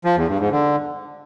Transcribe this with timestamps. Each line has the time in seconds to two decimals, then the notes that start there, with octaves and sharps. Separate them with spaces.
0.05 F3
0.16 E2
0.28 G2
0.40 G#2
0.51 D3